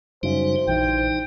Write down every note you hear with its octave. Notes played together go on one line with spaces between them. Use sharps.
F#2 C#3 G3 D#4 F#4 C5
A#1 E3 D#4 G5